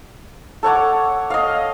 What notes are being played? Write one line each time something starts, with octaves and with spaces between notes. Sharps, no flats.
A4 C#5 F#5 D6
D#5 F5